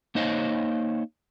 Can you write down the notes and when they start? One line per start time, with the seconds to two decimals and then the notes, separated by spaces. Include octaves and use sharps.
0.15 A#3 D#4 C5 C#5 D#5 F5